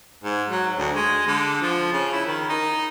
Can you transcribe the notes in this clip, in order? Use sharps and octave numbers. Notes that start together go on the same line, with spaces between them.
G#2
F#3
D2
G#3
D3
F3
C#3
E4
D#3
D#4